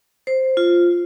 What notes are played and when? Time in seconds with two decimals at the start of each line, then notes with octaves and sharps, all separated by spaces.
0.27 C5
0.57 F4